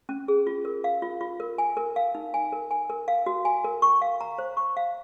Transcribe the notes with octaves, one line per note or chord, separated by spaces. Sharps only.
C#4
G#4
F4
A#4
F5
F4
F4
A#4
G#5
A#4
F5
D#4
G#5
A#4
G#5
A#4
F5
F#4
G#5
A#4
C#6
F5
A#5
C5
C#6
F5